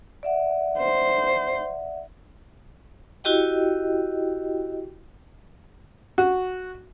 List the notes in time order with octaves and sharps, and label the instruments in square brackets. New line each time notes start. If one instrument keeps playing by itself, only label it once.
[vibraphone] D5 E5 F#5
[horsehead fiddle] C5
[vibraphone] E4 F#4 G4 D#5 G5
[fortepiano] F#4